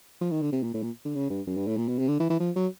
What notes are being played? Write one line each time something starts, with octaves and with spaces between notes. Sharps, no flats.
F3
D#3
D3
C3
A#2
A2
A#2
D3
C#3
G2
F#2
G2
A2
A#2
B2
C3
D3
E3
E3
F3
F#3